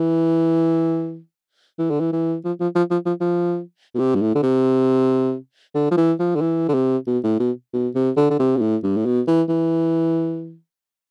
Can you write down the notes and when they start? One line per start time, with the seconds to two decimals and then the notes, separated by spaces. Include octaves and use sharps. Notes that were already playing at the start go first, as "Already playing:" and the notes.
Already playing: E3
1.79 E3
1.90 D3
2.00 E3
2.12 E3
2.45 F3
2.60 F3
2.75 F3
2.90 F3
3.05 F3
3.21 F3
3.95 B2
3.99 C3
4.15 G2
4.21 A2
4.35 D3
4.43 C3
5.75 D3
5.91 F3
5.97 E3
6.19 F3
6.35 D3
6.41 E3
6.69 D3
6.74 C3
7.07 B2
7.23 A2
7.39 B2
7.73 B2
7.95 C3
8.17 D3
8.30 D3
8.39 C3
8.57 B2
8.61 A2
8.83 G2
8.97 A2
9.06 B2
9.27 E3
9.49 E3